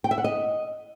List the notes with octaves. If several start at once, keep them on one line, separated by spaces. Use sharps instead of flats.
G5
E5
F#5
D#5